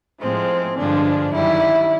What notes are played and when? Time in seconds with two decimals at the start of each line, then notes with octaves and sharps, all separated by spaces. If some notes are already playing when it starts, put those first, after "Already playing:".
0.22 A2 F3 G#3 C4
0.78 G2 D3 F3 G#3 D4
1.34 F#2 D#3 G3 E4